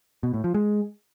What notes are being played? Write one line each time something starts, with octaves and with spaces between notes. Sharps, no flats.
B2
A2
F3
G#3